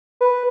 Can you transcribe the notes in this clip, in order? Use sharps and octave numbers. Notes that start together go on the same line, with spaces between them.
B4